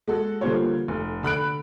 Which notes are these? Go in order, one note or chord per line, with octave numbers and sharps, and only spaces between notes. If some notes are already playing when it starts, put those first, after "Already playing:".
G#3 F#4 A4
D3 F3 G3 A#3 C5 C#5
F1
D3 B5 F#6 D7